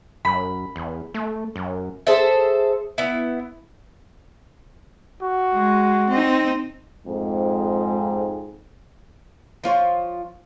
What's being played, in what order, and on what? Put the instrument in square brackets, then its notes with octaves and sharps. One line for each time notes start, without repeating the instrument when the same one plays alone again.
[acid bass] F#2 [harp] B5
[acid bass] E2
A3
F#2
[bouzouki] G#4 A4 C5 E5
B3 E4
[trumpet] F#4
[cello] G#3
C4 D#4
[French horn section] F2 G#2
[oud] F3 F4 C#5